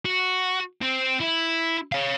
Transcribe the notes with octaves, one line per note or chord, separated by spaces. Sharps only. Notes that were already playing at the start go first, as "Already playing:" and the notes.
F#4
C4
E4
C#5 F5